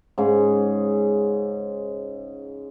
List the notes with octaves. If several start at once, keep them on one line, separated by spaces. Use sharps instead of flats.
G#2 C#3